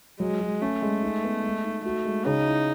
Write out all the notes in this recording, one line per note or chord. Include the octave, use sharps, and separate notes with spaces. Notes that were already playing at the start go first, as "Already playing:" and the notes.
F#3 G#3
F#3
A3 C#4
G#3
D#4
B3
G#3
D#4
A3 F#4
G#3
C#3 D#4
E4